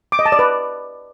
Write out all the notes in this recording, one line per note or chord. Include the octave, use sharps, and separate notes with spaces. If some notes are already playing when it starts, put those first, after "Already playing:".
D6
D#5
A5
D5
B4